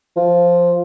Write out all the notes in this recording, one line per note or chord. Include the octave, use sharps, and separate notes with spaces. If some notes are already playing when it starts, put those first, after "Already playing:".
F3